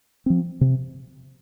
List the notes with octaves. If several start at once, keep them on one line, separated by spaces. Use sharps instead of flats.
F3 C4
C3